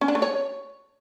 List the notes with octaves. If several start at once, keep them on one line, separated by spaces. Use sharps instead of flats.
C#4
D4
A3
C#5